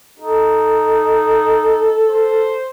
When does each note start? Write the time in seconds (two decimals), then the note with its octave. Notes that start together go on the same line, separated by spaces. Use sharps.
0.20 D#4 A4
2.09 C5